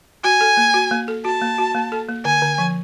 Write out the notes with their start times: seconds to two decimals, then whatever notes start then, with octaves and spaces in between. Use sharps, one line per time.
0.24 F#4 G#5
0.41 A4
0.57 A#3
0.74 F#4
0.91 A#3
1.08 A4
1.25 F#4 A5
1.42 A#3
1.58 F#4
1.75 A#3
1.92 A4
2.09 A#3
2.25 D3 G#5
2.42 D3
2.58 F3